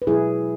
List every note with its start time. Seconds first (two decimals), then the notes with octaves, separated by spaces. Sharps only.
0.02 B4
0.07 B2 F#3 E4 G#4